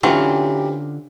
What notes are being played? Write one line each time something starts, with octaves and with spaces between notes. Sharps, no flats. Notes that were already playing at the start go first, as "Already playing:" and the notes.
D3 E3 F#3 C4 C#4 F4 G4